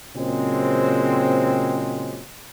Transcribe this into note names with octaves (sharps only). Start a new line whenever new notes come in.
A#2 C#3 F#3 G#3 C4